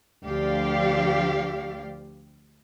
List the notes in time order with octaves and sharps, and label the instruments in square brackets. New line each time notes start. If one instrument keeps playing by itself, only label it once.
[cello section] D2 F3 G4 D5 F5